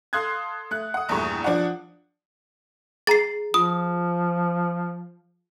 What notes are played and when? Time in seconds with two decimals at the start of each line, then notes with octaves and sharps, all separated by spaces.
0.13 A4 F5 C6 D#6 F#6 G#6
0.71 A3 F#6
0.94 F#5 D#6
1.09 A#1 E2 G2 A3 A#5 C#6
1.44 F3 D4 D5 F#5
3.07 G#4 A#5 A6 C7
3.54 F3 F4 D#6